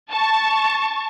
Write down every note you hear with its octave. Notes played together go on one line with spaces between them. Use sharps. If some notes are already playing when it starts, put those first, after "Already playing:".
A5 C#6